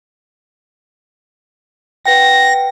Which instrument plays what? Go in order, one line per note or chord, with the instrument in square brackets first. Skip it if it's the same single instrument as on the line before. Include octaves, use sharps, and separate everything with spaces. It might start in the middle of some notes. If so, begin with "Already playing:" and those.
[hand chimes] B4 F#5 G5 [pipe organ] A#6